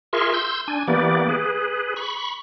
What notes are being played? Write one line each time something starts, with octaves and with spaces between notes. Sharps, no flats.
F4 G#4 A#4 E5 C6 C#6
C6 E6 G6
D4 G#5
E3 A#3 B3 G4 D5
G#4 B4
B5 C#6